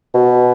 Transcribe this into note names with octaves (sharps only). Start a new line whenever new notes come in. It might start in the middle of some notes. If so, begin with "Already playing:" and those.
B2